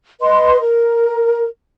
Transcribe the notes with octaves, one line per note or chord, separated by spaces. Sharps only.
B4 D#5 C6
A#4